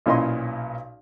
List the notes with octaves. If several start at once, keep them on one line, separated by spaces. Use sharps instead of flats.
B1 A#2 C#4 E4 D#5 C6